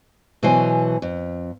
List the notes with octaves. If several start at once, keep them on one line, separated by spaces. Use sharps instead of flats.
B2 E3 F#3 C5 G#5
F2